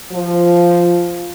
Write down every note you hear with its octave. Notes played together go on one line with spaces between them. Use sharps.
F3